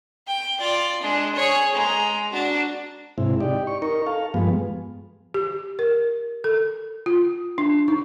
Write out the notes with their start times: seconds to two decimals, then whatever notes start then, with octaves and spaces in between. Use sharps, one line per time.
0.27 G5
0.59 F4 D5
1.01 G#3 D4
1.35 G#4 C#5
1.75 G#3 A#5
2.30 D4 F#4
3.18 G#2 C3 E4
3.40 D#4 G4 D5
3.67 C#6
3.82 D#4 A#4 C#6
4.06 A4 F5
4.34 G2 F3 G#3 B3
5.34 G4
5.79 A#4
6.44 A4
7.06 F4
7.58 D4
7.88 D#4